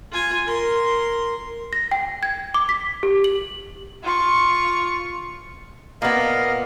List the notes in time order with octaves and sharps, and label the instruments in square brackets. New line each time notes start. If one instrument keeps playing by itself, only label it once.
[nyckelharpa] F4 G#5
A#4 C6
[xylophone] A#6
G5
G#6
D6
B6
G4
F#7
[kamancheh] F4 C#6
[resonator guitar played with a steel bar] A#2 B3 [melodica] A#4 D#5 F5